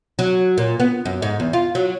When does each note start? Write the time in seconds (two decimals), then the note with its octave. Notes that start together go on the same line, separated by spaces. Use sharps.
0.19 F#3
0.58 A#2
0.80 B3
1.05 F#2
1.22 G#2
1.40 E2
1.53 F4
1.75 F#3